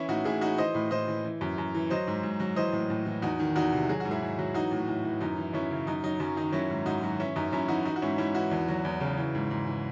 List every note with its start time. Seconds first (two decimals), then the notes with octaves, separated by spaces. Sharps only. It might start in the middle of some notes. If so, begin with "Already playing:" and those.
Already playing: E3 C#4 E4
0.08 A2 D#4 F#4
0.25 A2 E4 G#4
0.41 E3 D#4 F#4
0.58 E3 C5 D#5
0.75 A2
0.91 A2 C5 D#5
1.08 E3
1.24 E3
1.41 F#2
1.58 F#2
1.75 E3
1.90 F#3 C5 D#5
2.07 G#2
2.23 G#2
2.40 F#3
2.56 E3 C5 D#5
2.73 A2
2.90 A2
3.06 E3
3.22 E2 D#4 F#4
3.40 D#3
3.55 E2 D#4 F#4
3.73 C3
3.89 F#3 G#4
4.00 G#2 F#4
4.11 E4 G#4
4.22 G#2
4.39 F#3
4.54 E3 D#4 F#4
4.71 A2
4.88 A2
5.04 E3
5.21 F#2 D#4
5.37 E3
5.53 F#2 C#4 E4
5.71 C#3
5.87 F#2 D#4
6.04 F#3 D#4
6.20 F#2 C#4
6.37 D#3 D#4
6.53 F#3 C#4 E4
6.70 G#2
6.86 G#2 D#4 F#4
7.03 F#3
7.19 E3 C#4 E4
7.36 F#2 D#4
7.52 F#2 C#4 E4
7.68 E3 D#4 F#4
7.85 E3 D#4 F#4
7.96 F#4
8.02 G#2 C#4 E4
8.18 G#2 C#4 E4
8.35 E3 D#4 F#4
8.51 E2
8.68 F#3
8.85 E2
9.01 C#3
9.17 E3
9.35 G#2
9.51 G#2
9.67 E3